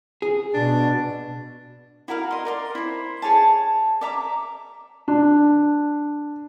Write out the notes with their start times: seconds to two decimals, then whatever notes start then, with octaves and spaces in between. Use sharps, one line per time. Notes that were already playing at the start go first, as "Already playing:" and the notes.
0.22 G#4
0.54 B2 D4
2.08 E4 F#4 A#4 F5
2.31 D#5 C6
2.45 A#4 D5 C6
2.75 E4 C5
3.22 G#4 C#5 G#5 A5
4.01 D5 E5 A#5 D6
5.08 D4